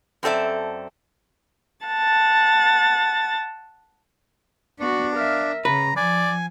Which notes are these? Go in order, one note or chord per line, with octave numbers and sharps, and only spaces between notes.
F#2 C4 A4 D5 E5
F#5 A5 A6
B3 D4 F#4
A#4 E5 F5
C#3 B4 A#5
F3 D5 G#5